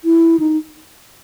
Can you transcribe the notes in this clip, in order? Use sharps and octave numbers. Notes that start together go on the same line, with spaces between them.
E4
D#4